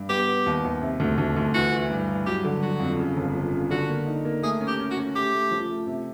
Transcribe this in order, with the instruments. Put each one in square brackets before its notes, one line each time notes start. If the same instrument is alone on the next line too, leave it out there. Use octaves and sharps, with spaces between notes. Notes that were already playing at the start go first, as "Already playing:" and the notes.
Already playing: [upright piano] G2
[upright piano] B3 [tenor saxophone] G4
[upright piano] B3
D#2
D#2
C3
D2
D2
D2
[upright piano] E3 [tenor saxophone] F#4
[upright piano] E3
G2
G2
[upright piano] F#3 [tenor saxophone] G4
[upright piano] D3
[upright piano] F#3 [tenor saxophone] F#4
[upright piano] F2
C#3
G1
F3
C#3
[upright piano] D3 [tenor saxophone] F#4
[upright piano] A#3
D#4
A#3
[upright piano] A3 [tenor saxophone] G#4
[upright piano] C#4
[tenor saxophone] G4
[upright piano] C#4
[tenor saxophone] F#4
[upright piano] C#4
[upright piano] A3 [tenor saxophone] G4
[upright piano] A3
F3
A3
C3